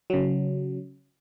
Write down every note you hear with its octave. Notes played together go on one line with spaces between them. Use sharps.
C#3 F#3